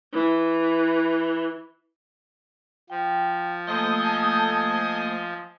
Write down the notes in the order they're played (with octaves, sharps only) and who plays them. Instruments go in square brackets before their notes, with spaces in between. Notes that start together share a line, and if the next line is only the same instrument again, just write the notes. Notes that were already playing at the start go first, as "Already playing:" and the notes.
[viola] E3
[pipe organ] F3 [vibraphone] G5
[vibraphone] A3 A#3 [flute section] A4 D#6 G6 [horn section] C5 D#5 G#5